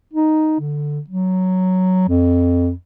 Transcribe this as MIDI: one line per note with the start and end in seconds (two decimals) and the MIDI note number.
0.13 0.58 63
0.60 0.99 50
1.09 2.06 54
2.08 2.72 41